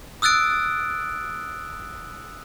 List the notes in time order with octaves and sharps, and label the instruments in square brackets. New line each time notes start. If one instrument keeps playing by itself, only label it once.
[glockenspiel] D#6 E6 F#6 A6 D7